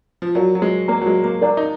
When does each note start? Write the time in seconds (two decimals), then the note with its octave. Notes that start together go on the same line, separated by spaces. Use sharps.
0.22 F3
0.35 F#3 A#4 D5 F5 A#5
0.55 F#3
0.62 G#3
0.88 A#3 A#4 D5 F5 A#5
1.01 F#3
1.07 G#3
1.24 A#3
1.42 D4 A#4 D5 F5 A#5
1.57 D#4